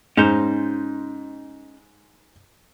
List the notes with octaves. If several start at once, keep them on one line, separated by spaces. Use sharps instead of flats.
G#2 C#4 D#4 C5